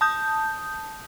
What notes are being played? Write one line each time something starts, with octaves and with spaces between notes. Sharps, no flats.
A5 D#6 G6